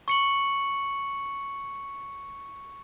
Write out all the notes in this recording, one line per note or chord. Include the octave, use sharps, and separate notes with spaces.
C#6 C#7 F#7